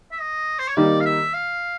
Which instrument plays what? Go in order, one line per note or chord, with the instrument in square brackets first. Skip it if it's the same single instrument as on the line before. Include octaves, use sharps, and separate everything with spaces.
[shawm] E5
D#5
C5
C#5
[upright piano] D#3 G3 A#3 D#4 [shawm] D5
[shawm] F5
E5
F5